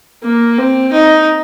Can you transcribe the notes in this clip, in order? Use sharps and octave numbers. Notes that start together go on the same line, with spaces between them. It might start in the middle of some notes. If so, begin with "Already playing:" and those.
A#3
C4
D#4